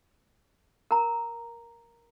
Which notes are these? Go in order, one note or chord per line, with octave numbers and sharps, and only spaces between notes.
A#4 A#5